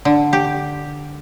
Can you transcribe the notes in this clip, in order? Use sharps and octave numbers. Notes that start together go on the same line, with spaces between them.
D3
G4